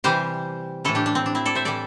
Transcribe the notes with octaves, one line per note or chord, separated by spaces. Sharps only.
C3 E3 G3 G4 C5
A2 E3 A3 E4 A4
D4 G4
D4
C4
D4
C4 E4
A4 D5
C5 E5
A2 E3 G3 A4 D5